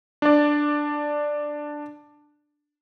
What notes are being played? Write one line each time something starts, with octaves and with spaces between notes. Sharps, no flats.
D4 D5